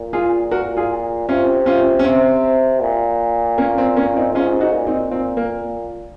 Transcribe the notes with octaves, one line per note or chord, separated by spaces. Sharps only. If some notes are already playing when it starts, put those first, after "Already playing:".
Already playing: A#2
F4 G#4
F#4 A#4
F4 G#4
C3 C#4 F4
C#4 F4
C#4
C4
A#2
A#3 C#4
C4
A#3 C#4
C4 D#4
G#2 C#4 F4
D#4 F#4
A#2
C4 D#4
A#2 C4
A#3